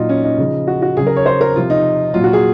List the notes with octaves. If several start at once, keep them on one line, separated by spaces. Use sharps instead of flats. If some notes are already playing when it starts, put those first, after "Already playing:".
Already playing: A#2 F#3 D#4 F4
C#4
D#4
C#3 F3
F#4
F#4
C#3 F#3 G#4
A#4
C#5
C5
A#4
C3 F3 F4
D#4
A#2 F#3 F4
F#4
G#4